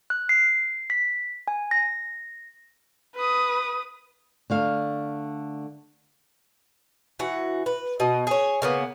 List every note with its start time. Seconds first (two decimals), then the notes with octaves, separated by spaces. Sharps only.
0.10 F#6
0.29 C7
0.90 B6
1.48 G#5
1.71 A#6
3.15 B4 D#6
4.50 D3 A3 F5
7.19 E3 F#4
7.66 B4
8.00 B2 D#5
8.27 G#4 C#5
8.62 C#3 A#3 B3